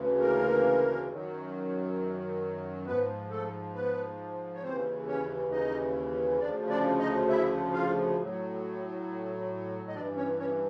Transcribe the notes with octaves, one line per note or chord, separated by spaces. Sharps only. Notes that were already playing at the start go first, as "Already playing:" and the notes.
Already playing: D2 C#3 E3
A#3 A#4
F#2 D#3 F#3
G#2 F3 B3 B4
A3 A4
B3 B4
C#5
D#2 C#3 E3 C4 C5
C#4 C#5
D#4 D#5
D2 C#3 F3 D4 D5
D4 D5
D#4 D#5
E4 E5
F4 F5
A2 F#3
D#5
G2 E3 D4 D5
C#4 C#5
C#4 C#5